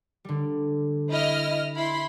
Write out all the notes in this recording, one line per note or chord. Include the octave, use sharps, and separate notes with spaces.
D3 G3
E4 D#5 F6
E4 B5 C6